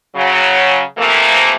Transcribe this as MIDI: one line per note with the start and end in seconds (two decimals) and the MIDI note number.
0.16 0.83 49
0.16 0.83 54
0.98 1.56 48
0.98 1.56 52
0.98 1.56 53
0.98 1.56 57
0.98 1.56 58